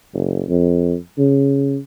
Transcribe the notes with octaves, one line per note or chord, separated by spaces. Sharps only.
F#1
F2
C#3